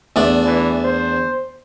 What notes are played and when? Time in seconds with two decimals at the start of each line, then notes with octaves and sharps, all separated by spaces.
0.16 E2 A3 D4
0.45 E3
0.85 C5